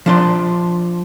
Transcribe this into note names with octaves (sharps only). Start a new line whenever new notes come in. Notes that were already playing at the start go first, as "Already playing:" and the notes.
F3 D4 C6